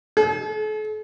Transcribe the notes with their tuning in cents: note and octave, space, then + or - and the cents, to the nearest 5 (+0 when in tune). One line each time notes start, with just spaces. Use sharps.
A4 -45